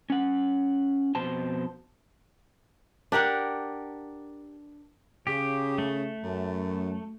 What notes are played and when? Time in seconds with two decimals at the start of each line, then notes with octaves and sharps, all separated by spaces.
0.10 C#4 F#5
1.15 F2 B2 C5 A5
3.12 D4 G4 A#4 F#5
5.27 C#3 G4
5.78 A3
6.23 F#2